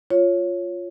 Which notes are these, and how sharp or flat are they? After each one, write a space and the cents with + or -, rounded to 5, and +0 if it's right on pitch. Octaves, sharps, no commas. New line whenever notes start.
F4 +0 C#5 +0